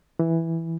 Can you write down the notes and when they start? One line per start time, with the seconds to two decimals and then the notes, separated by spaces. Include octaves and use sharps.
0.19 E3